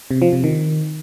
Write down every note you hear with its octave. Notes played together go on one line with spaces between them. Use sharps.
C3
F3
C3
D#3